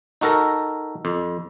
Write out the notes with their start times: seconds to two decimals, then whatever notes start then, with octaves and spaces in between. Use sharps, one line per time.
0.21 D#4 F#4 A4 A#4 A#5
1.05 F2